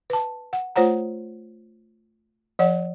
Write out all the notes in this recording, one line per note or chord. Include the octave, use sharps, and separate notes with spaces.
B4 A5
F#5
A3 F4 C5 C#5 F#5 A#5
F3 C#5 F#5